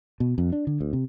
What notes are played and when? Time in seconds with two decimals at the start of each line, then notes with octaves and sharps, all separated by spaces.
0.20 B2
0.38 F2
0.53 D4
0.67 D3
0.81 D2
0.93 C3